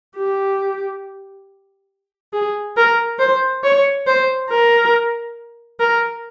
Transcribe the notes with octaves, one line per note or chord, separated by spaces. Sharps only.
G4
G#4
A#4
C5
C#5
C5
A#4
A#4